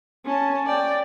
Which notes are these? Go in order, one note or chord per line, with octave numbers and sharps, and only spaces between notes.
C#4 A5
D5 G5